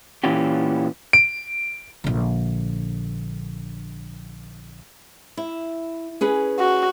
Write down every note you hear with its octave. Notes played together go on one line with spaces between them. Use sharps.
A#2 E3 C#4 F4 G4
D7
A#1 D3
E4
C#4 G#4 B4
F#4